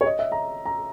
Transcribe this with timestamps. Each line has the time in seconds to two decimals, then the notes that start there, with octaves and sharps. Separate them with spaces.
0.01 C#5
0.06 D#5
0.19 E5
0.32 A#5
0.65 A#5